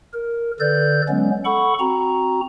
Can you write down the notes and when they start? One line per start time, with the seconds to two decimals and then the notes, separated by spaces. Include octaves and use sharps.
0.14 A#4
0.60 D3 A4 B4 D5 G6
1.09 F#3 G#3 B3 C#4
1.45 A4 F#5 B5 C#6
1.80 C4 F#4 A#5